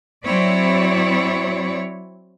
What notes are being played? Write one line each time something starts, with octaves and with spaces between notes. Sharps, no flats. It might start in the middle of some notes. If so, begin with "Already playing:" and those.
F#3 C4 E4 C#5 D5